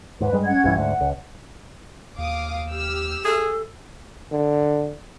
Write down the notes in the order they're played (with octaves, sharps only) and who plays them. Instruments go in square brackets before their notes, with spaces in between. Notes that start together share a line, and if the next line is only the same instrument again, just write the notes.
[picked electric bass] D#2 G#2 [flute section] B4
[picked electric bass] G2 G3 G#3
[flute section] C#4 F#5 G#6
[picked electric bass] B1 G2 E3
[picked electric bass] D2 G#2 [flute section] F#5
[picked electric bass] C#2
[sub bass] D#2 [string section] F5 D6 D#6
[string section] G4 E6 F6
[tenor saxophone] G#4 [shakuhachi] A4
[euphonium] D3